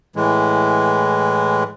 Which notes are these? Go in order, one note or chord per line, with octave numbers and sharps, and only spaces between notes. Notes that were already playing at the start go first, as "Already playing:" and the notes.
A2 E3 G#3